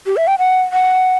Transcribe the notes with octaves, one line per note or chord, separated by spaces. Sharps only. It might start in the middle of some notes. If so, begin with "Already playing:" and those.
G4
E5
G5
F#5
F#5